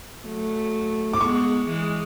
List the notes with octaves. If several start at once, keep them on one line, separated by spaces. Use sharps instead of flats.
F#3 A3
D6
G#3 B3 C#6
E3 G#3